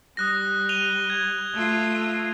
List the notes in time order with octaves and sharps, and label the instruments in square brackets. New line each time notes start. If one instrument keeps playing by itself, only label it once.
[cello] G3 [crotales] D#6 F#6 A#6
[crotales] D#7 F7 G7
G#6
[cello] A3 F4